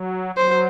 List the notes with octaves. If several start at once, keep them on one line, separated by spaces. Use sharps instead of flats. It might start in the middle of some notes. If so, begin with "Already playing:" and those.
Already playing: F#3
F#3 C5